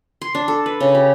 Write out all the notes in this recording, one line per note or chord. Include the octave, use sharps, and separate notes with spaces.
C6
D4
A4
B4
C#3
G4